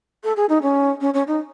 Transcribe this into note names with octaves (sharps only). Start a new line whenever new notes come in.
A4
G#4
D#4
C#4
C#4
C#4
D#4